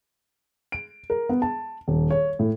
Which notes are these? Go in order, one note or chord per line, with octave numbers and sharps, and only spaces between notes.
D7
A#4
B3
A5
D#1
C#5
A2